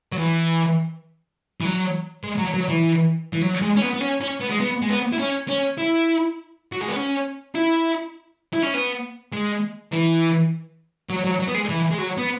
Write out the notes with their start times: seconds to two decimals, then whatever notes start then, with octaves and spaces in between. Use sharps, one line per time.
0.12 F#3
0.18 E3
1.61 E3
1.65 F#3
2.24 G#3
2.38 F#3
2.54 F#3
2.69 E3
3.33 E3
3.41 F#3
3.62 G#3
3.76 C#4
3.82 B3
3.94 B3
4.01 C#4
4.21 C#4
4.41 B3
4.51 G#3
4.60 B3
4.82 G#3
4.90 B3
5.13 E4
5.19 C#4
5.49 C#4
5.78 E4
6.72 F#3
6.81 G#3
6.88 B3
6.96 C#4
7.55 E4
8.54 E4
8.63 C#4
8.74 B3
9.33 G#3
9.93 E3
11.10 F#3
11.25 F#3
11.40 F#3
11.48 B3
11.55 G#3
11.69 E3
11.91 G#3
11.98 F#3
12.17 B3